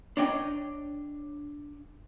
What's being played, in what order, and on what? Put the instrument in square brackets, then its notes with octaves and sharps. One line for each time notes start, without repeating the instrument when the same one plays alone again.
[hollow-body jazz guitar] D4 C#5 D#5 G5